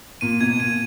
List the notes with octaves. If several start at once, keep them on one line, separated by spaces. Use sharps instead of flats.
A#2 D#7
B2 G#6
A#2 D#7